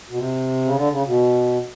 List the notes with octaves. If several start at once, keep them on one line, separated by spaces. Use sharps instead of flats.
B2
C3
C#3
D3
C#3
B2